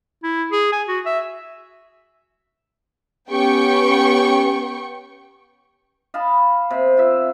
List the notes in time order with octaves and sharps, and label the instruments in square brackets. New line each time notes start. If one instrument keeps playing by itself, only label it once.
[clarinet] E4
G#4
G#5
F#4
E5
[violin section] B3 G5 C#6 [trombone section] C#4 G4
[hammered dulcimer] D#5 F5 A5 B5
C3
F4 E5